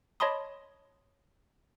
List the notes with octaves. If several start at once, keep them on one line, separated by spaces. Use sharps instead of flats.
C#5 D#5 A5 B5 C6 D#6